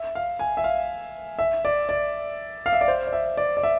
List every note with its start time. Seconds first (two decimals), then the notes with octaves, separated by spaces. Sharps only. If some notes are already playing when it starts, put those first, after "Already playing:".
Already playing: E5
0.15 F5
0.39 G#5
0.57 E5
0.64 F5
1.39 E5
1.65 D5
1.89 D5
2.66 F5
2.73 E5
2.81 D5
2.88 C5
3.07 D5
3.13 E5
3.37 D5
3.57 D5
3.63 E5